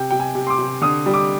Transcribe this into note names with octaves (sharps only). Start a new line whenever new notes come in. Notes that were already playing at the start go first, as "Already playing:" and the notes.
Already playing: C3 G5
C3 G5
G#5
C3
C6
D6
C3
D3 D#6
G3
D6